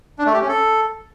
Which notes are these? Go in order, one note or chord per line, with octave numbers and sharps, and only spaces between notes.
D4
A3
G4
C#4
A4